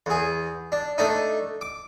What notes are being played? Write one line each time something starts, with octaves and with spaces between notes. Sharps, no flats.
E2 G#4
D4
A3 D4 D#4
D6